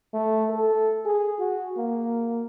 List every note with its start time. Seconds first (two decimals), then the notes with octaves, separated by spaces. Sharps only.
0.14 A3
0.50 A4
1.05 G#4
1.40 F#4
1.78 A#3